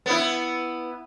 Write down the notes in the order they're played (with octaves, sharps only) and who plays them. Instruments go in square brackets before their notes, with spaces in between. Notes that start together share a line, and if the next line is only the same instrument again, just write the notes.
[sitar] B3 E4